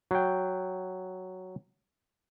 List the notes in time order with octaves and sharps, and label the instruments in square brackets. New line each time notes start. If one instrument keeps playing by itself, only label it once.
[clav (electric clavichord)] F#3 G5